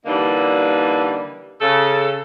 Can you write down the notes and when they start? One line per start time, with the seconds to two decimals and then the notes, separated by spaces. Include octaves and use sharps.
0.05 D3 E3 G3 A#3 D4 D#4
1.61 C#3 A4